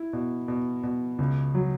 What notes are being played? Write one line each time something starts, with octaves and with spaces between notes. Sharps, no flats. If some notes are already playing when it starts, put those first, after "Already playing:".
Already playing: E4
B2
B2
B2
C#2
F#3